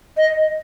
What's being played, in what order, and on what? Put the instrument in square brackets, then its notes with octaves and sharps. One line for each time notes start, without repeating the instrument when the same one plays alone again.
[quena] D#5